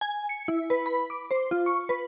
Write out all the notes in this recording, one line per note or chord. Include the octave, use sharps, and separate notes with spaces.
G#5
C#7
E4
B4
B5
D6
C5
F4
C#6
B4